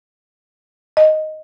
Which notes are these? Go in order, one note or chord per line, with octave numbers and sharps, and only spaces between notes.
D#5